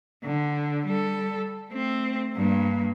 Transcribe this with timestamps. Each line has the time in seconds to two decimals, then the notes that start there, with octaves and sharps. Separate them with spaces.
0.24 D3
0.86 G3 A4
1.69 A3 C4
2.35 G2 A#3